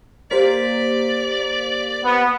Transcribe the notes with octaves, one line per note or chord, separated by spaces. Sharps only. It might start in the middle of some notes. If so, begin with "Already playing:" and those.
A#3 G4 C5 D5 B6
B3